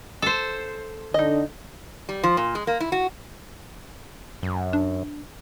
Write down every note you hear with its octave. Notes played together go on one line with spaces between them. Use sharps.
A4 C5
D3 D#4 D#5
G3
F3
A#2
G#3
A#3
E4
F#4
F#2
D4